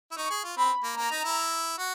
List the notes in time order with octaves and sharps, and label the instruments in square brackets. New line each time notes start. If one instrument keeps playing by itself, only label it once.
[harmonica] E4
[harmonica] D#4 [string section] C#6
[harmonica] G#4
F4
[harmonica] C4 [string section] B5
[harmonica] A#3
[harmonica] A#3 [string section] A#5
[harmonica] D#4
E4
F#4